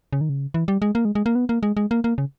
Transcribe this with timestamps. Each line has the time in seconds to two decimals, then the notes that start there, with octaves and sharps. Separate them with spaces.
0.13 C#3
0.21 D#3
0.29 C#3
0.54 E3
0.68 G3
0.82 G#3
0.95 A#3
1.05 G#3
1.15 G#3
1.26 A#3
1.35 B3
1.49 A#3
1.63 G#3
1.77 G#3
1.91 A#3
2.04 A#3
2.18 C#3